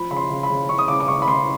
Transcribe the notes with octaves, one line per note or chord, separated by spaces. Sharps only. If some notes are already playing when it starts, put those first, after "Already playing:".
Already playing: F3 B5
C#3 B5
C6
C#3
B5
C#3
C#3 C#6
D#6
C#3 D6
D6
C#3 C#6
B5
C#3 C6